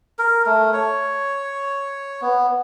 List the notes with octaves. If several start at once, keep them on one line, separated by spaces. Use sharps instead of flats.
A#4
A3
C#5
B3